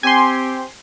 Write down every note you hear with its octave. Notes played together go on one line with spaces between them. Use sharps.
C4 G4 G#5 C6